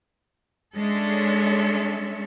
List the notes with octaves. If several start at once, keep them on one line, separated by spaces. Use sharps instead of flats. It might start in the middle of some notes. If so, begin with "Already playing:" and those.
G#3 C#4 D4 A4 C#5 E5